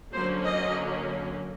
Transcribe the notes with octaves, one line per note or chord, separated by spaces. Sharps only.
D3 F#3 A#3 C#4 C5
D#5